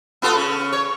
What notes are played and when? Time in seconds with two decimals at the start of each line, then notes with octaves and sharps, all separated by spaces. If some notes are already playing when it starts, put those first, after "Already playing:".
0.22 B3 F4 A4
0.35 C#3
0.73 C#5